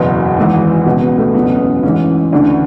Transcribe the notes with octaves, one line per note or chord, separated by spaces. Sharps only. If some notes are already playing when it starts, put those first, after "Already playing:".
Already playing: F#1 E2 B2 B3
G#1 G#2 E3
C#2 B2
B3
A3
F#1 E2 B2 B3
C#4
B3
A1 G#2 E3 C#4
D2 C#3 E3 D4